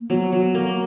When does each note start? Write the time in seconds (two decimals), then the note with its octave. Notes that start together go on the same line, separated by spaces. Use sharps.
0.01 A#3
0.10 F#3 B3
0.33 F#3
0.55 A#3